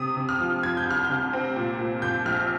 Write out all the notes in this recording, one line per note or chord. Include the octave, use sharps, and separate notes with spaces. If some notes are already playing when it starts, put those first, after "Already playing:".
Already playing: C3 D#6
C3
F6
F3
F3 G#6
G6
C2 F6
C3 G6
C4
A#2
A#2
A#2 G6
A#1 F6